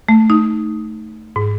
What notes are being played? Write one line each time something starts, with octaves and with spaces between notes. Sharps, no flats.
A3
D#4
G#2